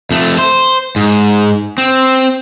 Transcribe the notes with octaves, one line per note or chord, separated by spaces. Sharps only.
F2 A3
C5
G#2
C4